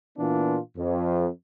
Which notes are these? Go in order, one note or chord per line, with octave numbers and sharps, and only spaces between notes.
A#2 E3 B3 D4 F4
F2